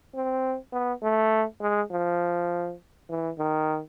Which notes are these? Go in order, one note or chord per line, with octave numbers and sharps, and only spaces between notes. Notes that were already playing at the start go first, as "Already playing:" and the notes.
C4
B3
A3
G#3
F3
E3
D#3